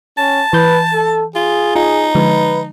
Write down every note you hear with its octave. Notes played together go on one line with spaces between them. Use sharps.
C#4 A5
E3 B4 G6
A4
F4 G#4
D#4 F4
D3 F3 G#3 B4